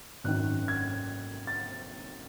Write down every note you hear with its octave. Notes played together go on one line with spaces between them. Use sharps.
G#1 F#2 D#3 F#6
G#6
A6